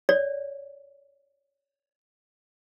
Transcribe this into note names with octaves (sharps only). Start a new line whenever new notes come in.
C#5 D5